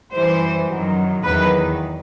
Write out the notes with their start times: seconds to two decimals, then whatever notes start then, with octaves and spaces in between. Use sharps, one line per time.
0.12 F#2 E3 G3 C5
0.68 F#2 D#3 F#3
1.23 E2 D#3 F#3 B4